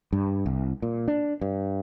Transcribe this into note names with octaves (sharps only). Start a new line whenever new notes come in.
G2
C2
A#2
D4
G2